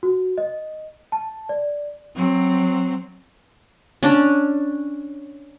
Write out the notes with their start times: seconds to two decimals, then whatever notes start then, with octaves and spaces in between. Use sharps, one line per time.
0.03 F#4
0.38 D#5
1.12 A5
1.49 D5
2.15 F#3 C4
4.03 C#4 D4